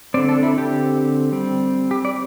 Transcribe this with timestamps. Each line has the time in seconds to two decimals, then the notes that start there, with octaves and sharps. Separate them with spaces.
0.14 C4 D5
0.17 D3
0.29 A4
0.43 E4
0.58 G4
1.32 G3 C4
1.91 G4
2.05 D5